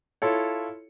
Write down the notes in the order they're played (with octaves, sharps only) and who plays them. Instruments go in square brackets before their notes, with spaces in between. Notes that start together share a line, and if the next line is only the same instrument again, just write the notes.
[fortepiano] E4 F4 A4 C#5